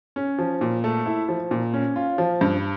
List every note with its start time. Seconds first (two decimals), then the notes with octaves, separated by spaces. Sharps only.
0.16 C#4
0.39 F3
0.61 A#2
0.84 A3
1.06 E4
1.29 F3
1.51 A#2
1.74 C#4
1.96 F4
2.18 F3
2.41 G2